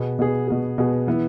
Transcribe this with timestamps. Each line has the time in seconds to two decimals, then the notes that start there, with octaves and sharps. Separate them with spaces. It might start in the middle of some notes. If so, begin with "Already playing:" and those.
Already playing: B2 B3 G#4
0.19 B2 B3 G#4
0.48 B2 B3 G#4
0.78 B2 B3 G#4
1.07 E3 B3 E4